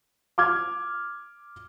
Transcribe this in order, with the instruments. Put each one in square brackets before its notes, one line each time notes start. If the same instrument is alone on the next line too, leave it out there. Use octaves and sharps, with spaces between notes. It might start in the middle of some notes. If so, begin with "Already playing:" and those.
[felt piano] D6 F6 G#6